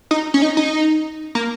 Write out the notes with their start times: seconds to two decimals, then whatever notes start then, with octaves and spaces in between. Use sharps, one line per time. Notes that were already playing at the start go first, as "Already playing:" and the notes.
0.11 D#4
0.34 C#4
0.42 D#4
0.57 D#4
1.35 A#3